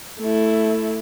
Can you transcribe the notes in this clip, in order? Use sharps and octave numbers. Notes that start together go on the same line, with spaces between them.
A3 E4